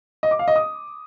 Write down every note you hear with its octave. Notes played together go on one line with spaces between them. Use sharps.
D#5
D6
F5
D#5
D#6